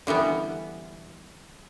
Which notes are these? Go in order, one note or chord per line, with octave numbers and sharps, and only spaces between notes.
D3 E3 G3 B3